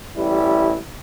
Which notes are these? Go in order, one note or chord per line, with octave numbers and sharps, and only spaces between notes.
A1 G3 E4